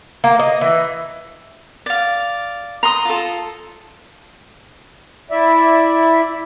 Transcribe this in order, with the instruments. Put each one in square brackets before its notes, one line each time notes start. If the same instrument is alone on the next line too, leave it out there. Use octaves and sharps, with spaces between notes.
[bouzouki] A#3
D#5
E3
[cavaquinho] D5 F5
A#5 C6 D#6
F4 A4
[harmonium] E4 D5 E5